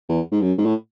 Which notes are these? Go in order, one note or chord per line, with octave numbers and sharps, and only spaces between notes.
E2
G#2
F#2
G#2
A2